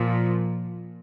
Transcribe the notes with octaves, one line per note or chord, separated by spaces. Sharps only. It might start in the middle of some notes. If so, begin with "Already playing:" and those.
Already playing: A#2 F3